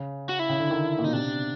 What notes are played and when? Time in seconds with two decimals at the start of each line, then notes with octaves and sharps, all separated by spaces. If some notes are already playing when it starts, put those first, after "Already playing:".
Already playing: C#3
0.29 F#4
0.39 E4
0.49 C#3
0.60 D3
0.71 D#3
0.99 A#2
1.04 B2 D#4
1.13 C3 D4